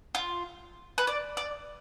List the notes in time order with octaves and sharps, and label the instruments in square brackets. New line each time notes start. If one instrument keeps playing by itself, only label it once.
[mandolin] F4
B4
D5
D5